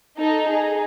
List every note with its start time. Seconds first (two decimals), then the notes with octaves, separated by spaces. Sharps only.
0.19 D#4 A4
0.48 D#4 G#4